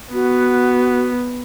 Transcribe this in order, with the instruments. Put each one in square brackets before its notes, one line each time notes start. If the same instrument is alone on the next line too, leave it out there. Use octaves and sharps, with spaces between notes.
[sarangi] B3 [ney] F#4